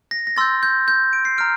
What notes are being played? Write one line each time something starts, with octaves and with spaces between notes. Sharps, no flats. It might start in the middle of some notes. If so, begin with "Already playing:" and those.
A#6
A#6
C6 E6 G6 A6
G6
G6
D7
C7
A#5 F6 D7